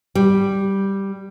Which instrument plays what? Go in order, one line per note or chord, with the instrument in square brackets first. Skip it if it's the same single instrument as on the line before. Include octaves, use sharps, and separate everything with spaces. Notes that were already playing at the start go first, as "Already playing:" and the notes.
[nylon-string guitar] G3